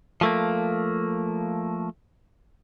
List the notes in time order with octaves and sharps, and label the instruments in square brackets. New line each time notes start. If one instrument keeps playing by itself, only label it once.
[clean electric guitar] F3 A3 A#3